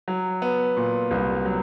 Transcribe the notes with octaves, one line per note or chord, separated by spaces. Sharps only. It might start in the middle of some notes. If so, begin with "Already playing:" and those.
F#3
B3
A#2
C2
F#3